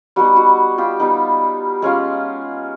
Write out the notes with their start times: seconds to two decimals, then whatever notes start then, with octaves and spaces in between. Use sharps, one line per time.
0.16 G3 B3 D#4 F#4
0.36 F#4
0.78 F4 G4
1.00 G3 B3 D#4
1.82 G#3 C#4 F4